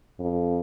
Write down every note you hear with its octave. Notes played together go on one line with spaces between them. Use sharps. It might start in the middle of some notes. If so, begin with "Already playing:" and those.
F2